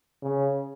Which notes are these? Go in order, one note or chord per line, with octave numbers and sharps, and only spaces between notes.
C#3